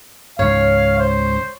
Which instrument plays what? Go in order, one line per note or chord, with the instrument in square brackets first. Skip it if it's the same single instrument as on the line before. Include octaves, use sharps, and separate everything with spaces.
[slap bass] C#2 G#2 [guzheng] C#5 [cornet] F5
[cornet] C5